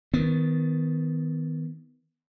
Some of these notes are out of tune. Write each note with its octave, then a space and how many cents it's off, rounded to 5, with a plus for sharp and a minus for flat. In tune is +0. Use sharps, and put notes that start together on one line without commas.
D#3 +25 B3 +20